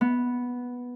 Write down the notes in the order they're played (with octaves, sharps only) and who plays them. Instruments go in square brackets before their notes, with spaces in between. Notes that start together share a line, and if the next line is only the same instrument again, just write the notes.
[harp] B3